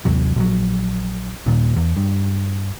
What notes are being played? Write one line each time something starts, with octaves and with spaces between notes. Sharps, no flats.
A1 D#2 C3 F#3
A#1 F#3
D#1 D#2 A#2 D#3
E2
G2